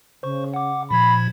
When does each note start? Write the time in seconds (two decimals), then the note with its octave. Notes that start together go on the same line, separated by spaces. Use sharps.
0.23 C#3 C5 C#6
0.54 F#5 D6
0.91 A#2 F3 B5 G#6